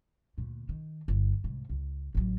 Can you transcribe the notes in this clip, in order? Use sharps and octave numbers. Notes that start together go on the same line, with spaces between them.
D2 A#2
D#3
G1
C2 G#2
C#2
A1 F#3